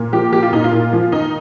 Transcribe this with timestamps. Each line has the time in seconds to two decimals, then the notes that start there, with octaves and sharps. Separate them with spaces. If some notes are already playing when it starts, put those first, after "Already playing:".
Already playing: A#2
0.13 F3 G4
0.32 F3 G4
0.43 F4
0.53 A#2 D#4
0.64 F4
0.73 A#2
0.93 F3
1.12 D#3 D#4